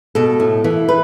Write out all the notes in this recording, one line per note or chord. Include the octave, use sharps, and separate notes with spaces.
B2 A4
A2
E3
B4